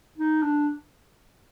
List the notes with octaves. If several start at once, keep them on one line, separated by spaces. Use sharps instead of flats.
D#4
D4